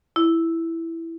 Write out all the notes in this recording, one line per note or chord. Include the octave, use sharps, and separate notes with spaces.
E4